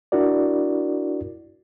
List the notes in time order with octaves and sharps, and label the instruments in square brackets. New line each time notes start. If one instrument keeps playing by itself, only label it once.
[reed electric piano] D4 E4 F#4 A#4 D5